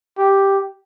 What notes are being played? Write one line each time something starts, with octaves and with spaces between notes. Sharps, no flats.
G4